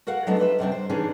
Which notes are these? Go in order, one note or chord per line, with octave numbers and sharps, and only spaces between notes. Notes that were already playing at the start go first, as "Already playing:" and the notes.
F#4 A#4 F5 F#5
F#3 G#3 A3 B3 D4
F4 B4 C#5 E5
F#2 C3 G3 D4
C5
D#3 E3 C#4 D4 G#4